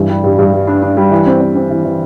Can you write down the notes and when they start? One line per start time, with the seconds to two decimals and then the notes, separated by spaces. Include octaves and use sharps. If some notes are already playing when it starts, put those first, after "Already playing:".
Already playing: G2 E3
0.09 G3
0.24 G2
0.39 G2
0.53 G3
0.67 D4
0.82 D4
0.97 G3
1.11 E3
1.26 C4
1.41 C4
1.55 C4
1.70 E3
1.85 E3